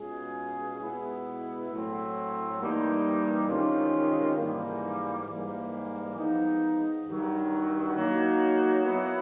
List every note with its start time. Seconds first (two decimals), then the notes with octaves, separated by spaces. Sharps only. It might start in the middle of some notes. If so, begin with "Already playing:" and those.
Already playing: B2 G#3 C#4 F4 G#4
0.80 B2 G#3 B3 E4
1.70 A2 F#3 A3 C4
2.59 G2 E3 G3 A#3 D#4
3.48 C3 D#3 G#3 C#4 F4
4.37 G#2 E3 G3 A#3
5.28 G#2 E3 G3 A#3
6.16 F3 G#3 B3 D#4
7.06 G2 D#3 F#3
7.96 F#3 A#3 D#4
8.84 F#3 B3 E4